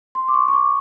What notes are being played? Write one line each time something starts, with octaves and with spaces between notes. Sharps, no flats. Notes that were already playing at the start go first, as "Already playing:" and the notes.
C6
D6
C#6
C#6
D6